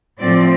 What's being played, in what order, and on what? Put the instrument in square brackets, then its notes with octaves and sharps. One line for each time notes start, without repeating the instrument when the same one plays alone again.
[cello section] A2 F3 C4 D5